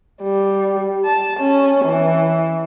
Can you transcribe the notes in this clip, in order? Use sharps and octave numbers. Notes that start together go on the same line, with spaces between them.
G3
A5
C#4
E3